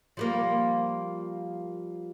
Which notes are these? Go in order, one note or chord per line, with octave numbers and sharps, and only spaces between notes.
F3 G3 A#3